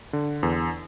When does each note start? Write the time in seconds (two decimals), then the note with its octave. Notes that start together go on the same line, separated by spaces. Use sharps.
0.13 D3
0.43 E2